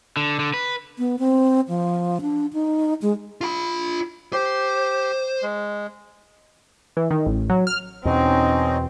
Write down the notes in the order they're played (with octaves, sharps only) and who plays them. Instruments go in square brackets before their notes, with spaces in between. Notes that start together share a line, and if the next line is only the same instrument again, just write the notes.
[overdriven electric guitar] D3
D3
B4
[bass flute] B3
C4
F3
D4
D#4
G#3
[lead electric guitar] F4 B5
[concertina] G4 [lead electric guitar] C5
[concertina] G#3
[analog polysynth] E3
D#3
A1
F#3
F6
[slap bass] E2 B2 [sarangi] C4 [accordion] C#4 D#4 D#5